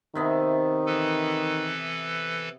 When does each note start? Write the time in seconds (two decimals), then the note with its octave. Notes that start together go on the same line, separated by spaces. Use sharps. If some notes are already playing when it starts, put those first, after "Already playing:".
0.15 C3 D#3 B3 E5
0.86 E3 A4 B4